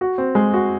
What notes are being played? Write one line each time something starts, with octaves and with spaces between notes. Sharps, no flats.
F#4
C4
G#3
F#4